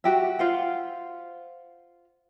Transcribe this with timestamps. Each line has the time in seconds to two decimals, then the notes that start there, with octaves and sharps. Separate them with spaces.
0.04 F#4 G4 E5
0.39 F4 C5 F#5